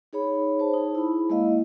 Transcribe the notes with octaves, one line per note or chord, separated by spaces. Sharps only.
D#4 G#4 C#5 B5
C5 A5
D#4 G#4
E4 B5
G#3 A#3 E4 D#5 F5